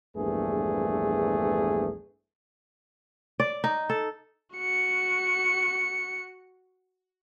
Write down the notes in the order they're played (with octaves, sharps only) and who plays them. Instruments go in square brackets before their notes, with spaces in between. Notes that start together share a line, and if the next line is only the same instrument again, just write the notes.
[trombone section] A#1 E2 G2 A3 G#4 B4
[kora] D5
D#4
A4
[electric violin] F#4 C#7